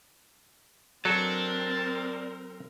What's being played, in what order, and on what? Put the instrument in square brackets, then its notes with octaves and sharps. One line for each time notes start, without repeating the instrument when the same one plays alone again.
[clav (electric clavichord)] F#3 A4 [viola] C4 A#4 [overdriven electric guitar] D5 A5